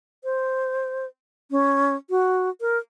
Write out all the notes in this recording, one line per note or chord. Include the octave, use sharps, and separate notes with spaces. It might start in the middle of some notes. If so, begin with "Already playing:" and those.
C5
C#4
F#4
A#4